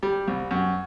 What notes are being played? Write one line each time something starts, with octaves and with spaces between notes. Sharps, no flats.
G3
C2
F#2